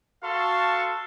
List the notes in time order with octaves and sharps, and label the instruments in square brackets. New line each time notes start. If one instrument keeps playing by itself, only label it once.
[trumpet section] F#4 A4 F5 A5 C6 C#6